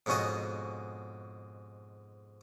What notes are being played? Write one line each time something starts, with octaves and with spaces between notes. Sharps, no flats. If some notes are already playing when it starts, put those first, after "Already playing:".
F2 G#2 B2 C#4 F#4 D#5